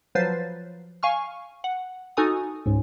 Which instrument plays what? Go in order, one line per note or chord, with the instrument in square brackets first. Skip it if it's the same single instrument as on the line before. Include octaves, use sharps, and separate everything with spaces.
[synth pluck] F3 F#3 B4 C5 A6 C7
F5 G#5 C#6 F6
F#5
D#4 F#4 A4 G#5 A#5 D#6
C#2 G#2